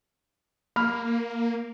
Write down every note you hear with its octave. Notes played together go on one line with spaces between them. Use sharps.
A#3 B5 F6